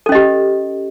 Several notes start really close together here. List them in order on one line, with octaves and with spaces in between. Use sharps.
A4 C#4 D#5 G4